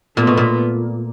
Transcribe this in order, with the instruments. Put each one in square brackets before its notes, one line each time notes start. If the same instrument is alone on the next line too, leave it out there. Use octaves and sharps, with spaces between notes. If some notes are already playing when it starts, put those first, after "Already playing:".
[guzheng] A#2 [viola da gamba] A3 B3
[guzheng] B2
A#2